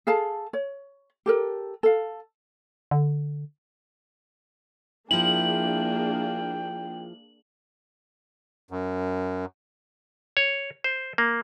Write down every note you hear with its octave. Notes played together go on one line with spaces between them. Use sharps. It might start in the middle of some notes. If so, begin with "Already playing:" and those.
G#4 A4 F5 A5
C#5
G4 A4 A#4
A4 F5
D3
F3 A#3 D4 E4 G#4 G5 F#7
F#2
C#5
C5
A#3